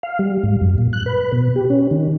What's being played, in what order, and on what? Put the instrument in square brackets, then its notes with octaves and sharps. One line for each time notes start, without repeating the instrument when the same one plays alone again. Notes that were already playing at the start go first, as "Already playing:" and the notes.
[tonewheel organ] F5
G3
G#2
F#2
A#2
F#6
B4
B2
G4
C#4
D#3